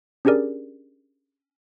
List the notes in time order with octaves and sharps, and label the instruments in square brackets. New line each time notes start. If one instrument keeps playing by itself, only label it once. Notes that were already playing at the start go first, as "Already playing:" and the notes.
[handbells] C#4 D4 G4 G#4 A#4 D5